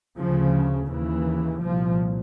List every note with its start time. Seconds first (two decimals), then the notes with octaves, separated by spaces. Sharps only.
0.18 D2 C#3 F3
0.89 D#2 C#3 E3
1.62 C2 A#2 F3